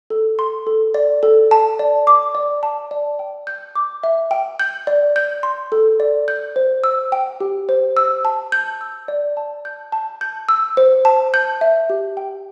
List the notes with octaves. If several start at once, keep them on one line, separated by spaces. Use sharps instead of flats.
A4
C6
A4
D5
A4
A5
D5
D6
D5
A5
D5
G5
G6
D6
E5
G5
G6
D5
G6
C6
A4
D5
G6
C5
E6
G5
G4
C5
E6
A5
G6
E6
D5
A5
G6
A5
G6
E6
C5
A5
G6
E5
G4
G5